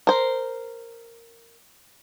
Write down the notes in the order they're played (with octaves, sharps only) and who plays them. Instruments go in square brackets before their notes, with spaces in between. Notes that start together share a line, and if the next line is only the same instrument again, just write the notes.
[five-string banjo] A#4 C5